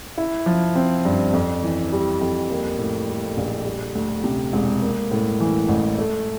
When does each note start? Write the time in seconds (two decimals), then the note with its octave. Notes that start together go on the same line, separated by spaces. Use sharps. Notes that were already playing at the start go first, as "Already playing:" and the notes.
0.18 E4
0.46 F3
0.75 C4
1.05 G2
1.33 F2
1.63 E3
1.92 G3
2.21 F2
2.50 A#3
2.78 A2
3.08 G3
3.37 A#1
3.66 G3
3.95 D2
4.24 C3
4.53 E1
4.82 A#3
5.11 A2
5.40 E3
5.69 A1
5.98 A3